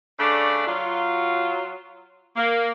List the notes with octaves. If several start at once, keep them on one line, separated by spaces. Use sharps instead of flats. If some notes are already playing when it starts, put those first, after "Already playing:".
C#3 A3 D4 D5
F#3 F4
A#3